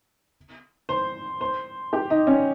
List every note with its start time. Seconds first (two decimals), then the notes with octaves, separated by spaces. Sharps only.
0.89 C5
1.41 C5
1.93 G4
2.10 D#4
2.27 C#4